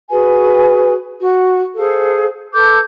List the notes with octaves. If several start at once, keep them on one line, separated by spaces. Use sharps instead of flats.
F#4 G#4 B4 G#5
F#4
G#4 A4 C5 F5
A4 B4 D6 G6